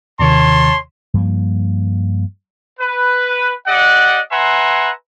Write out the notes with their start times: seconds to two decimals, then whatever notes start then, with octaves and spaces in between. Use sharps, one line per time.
0.19 D#2 C3 D#3 C#5 A5 C6
1.14 G2 F3 A#3
2.80 B4
3.67 G4 D5 D#5 F#5
4.32 B4 E5 F#5 G#5 A#5 C6